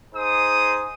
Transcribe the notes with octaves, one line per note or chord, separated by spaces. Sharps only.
D#4 G#4 C5 D#6